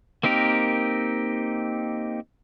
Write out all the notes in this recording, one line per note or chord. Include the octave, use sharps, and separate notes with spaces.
A#3 C4 D#4 G4 A#4